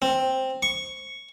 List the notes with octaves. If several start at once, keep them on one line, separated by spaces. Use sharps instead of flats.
C4
C#6